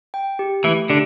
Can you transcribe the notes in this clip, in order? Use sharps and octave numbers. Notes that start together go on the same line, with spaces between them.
G5
G4
E3 A3 E4
D3 D4 G4